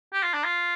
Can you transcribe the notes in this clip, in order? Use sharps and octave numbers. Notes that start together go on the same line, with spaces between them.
G4
F4
D4
F4